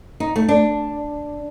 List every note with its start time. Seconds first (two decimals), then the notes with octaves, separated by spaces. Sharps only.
0.20 D#4
0.36 A3
0.48 D4